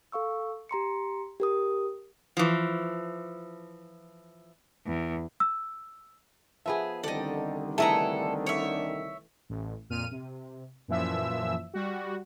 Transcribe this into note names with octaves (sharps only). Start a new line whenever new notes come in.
A4 F5 C#6 E6
G4 A#5 C6 C#7
G4 A#4 D#6
E3 F3
E2
E6
F3 B3 G#4 B4 E5
C2 D3 D#3 G4 A4 D5 D#5
E3 A3 E4 G#4 A4 B4 D#5 A#5
C#5 E5
A1
F2 A#2 F6 D#7
C3
F#2 A#2 E3 F3 E5 E6
G3 F#4